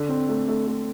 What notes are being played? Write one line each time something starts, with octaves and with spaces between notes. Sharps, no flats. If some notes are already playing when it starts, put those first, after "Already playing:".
Already playing: D3
C4
A3
A3
A3